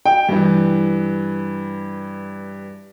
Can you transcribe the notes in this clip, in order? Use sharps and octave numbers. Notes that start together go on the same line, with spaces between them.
G5
G2 E3